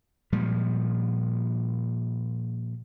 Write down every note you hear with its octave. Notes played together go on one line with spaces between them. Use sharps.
A#2 F3 G3 G#3